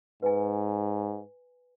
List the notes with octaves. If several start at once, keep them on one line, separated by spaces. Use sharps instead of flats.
G#2 B4 G#5